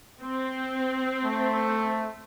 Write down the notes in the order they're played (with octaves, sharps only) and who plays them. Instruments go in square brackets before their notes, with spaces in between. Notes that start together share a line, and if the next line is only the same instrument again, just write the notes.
[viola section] C4
[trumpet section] A3